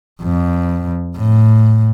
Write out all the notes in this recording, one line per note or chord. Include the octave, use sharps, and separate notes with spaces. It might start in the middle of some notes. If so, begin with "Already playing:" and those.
F2
A2